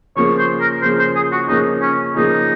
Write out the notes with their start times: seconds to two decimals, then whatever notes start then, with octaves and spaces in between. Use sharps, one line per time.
0.16 C#3 F3 A#3 C#5
0.39 C5
0.61 A#4
0.82 C#3 F3 A#3 C5
0.99 C5
1.15 G#4
1.32 F#4
1.48 C#3 F3 A#3 D#4
1.81 C#4
2.14 C#3 F3 A#3 D#4